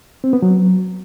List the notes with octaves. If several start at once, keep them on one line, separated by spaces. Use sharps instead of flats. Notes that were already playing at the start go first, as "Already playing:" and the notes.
C4
B3
F#3